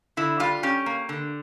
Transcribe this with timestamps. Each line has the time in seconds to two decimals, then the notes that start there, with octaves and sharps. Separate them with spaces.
0.17 D3 E4
0.40 G3 F4
0.63 C#4 G4
0.86 A#3
1.09 D3